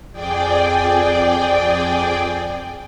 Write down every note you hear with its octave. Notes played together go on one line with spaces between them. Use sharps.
F2 G#4 D5 G5